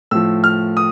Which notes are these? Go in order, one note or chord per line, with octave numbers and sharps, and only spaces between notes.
A2 F3 E6
F6
D#6